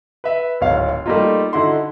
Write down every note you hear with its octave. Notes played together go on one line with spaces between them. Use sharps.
B4 E5
D1 G#1 C#5 F5
G3 A3 A#3 D#4 F4
D3 D#4 E4 F#4 C6